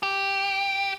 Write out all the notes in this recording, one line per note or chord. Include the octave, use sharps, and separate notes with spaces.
G4